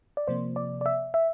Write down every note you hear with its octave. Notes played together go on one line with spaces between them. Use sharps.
D5
C3 F3 A#3 C5
D5
D5
E5
E5